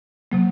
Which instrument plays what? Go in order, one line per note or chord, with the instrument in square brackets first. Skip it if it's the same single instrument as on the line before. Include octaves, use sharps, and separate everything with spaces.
[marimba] C3 F#3 A#3